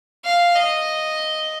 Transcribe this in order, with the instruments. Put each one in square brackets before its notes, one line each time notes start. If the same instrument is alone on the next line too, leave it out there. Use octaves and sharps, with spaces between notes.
[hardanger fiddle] F5
D#5